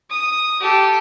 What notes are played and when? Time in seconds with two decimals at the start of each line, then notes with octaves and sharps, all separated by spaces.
0.10 D#6
0.61 G4 A4